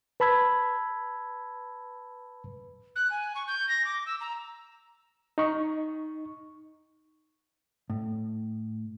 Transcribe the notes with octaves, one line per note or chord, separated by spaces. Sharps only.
B4 A5 B5 E6 G#6
F#6
G#5
C#6
G6
A#6
D6
E6
A#5
D#4 C#6
A2